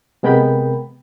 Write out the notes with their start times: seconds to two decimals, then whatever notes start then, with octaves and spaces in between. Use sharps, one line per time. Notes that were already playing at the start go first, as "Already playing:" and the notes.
0.23 C3 G#3 B3 A#4 G5 B5